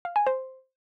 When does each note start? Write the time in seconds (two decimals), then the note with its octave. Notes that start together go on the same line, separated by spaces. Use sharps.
0.05 F5
0.16 G#5
0.27 C5